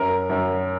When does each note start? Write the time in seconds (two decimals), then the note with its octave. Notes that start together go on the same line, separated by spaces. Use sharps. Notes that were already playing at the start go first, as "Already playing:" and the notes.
Already playing: F#2 A#4
0.29 F#2